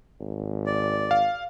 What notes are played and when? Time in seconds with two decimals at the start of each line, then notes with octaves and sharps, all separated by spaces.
0.20 G#1
0.66 D5
1.11 F5